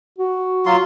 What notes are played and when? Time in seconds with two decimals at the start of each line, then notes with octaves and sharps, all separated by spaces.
0.18 F#4
0.66 F#3 F4 C6